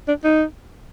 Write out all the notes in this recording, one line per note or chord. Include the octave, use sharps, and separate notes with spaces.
D4
D#4